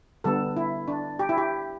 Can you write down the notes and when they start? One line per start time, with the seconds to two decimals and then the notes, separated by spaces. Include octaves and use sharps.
0.24 D3 G3 B3 A4
0.57 E4
0.88 D4
1.19 G4
1.29 E4
1.38 G4